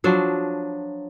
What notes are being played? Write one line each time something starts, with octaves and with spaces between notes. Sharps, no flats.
F3 F#3 D4